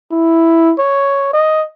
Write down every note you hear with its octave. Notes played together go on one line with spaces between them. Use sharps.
E4
C#5
D#5